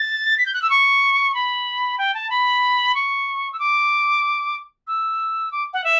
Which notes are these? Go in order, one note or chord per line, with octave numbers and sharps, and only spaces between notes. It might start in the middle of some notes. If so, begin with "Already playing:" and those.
Already playing: A6
B6
G6
F#6
E6
C#6
B5
G5
A5
B5
C#6
E6
D6
E6
D6
F#5
E5